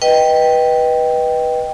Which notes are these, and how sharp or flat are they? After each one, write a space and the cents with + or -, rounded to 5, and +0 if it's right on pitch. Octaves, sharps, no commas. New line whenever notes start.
B4 -15 D#5 -5 G5 +0